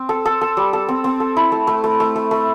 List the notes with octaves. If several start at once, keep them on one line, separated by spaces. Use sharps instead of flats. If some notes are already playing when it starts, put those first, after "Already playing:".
Already playing: C4
A4
A4
A4
G3
A4
C4
C4
A4
E4
A3
A3
A3
A3
A3
A3